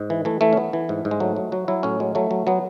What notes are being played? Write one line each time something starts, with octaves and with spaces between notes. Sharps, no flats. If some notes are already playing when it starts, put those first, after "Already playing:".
Already playing: G#2
E3
E3 A3
E3 A3
C#4
E3 B3
E3
G#2
G#2
G#3
F#3 A3
F#3
F#3 F#4
F#3 E4
A2 C#4
F#3 G#3
F#3 A3
F#3
F#3 B3